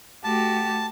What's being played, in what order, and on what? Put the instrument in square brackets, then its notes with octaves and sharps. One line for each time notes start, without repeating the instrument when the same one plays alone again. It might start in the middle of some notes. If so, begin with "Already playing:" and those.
[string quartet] A3 F#4 G4 [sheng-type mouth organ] A5